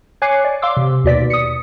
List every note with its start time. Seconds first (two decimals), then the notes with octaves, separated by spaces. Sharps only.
0.22 C#5 G#5 D6 F#6 C7
0.45 D5
0.62 F5 C6 D6 E6
0.77 C3
1.04 D#2 B2 D5 B6
1.30 D#6 C#7